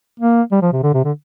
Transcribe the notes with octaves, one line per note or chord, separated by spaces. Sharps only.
A#3
G3
F3
C3
D3
C3
D3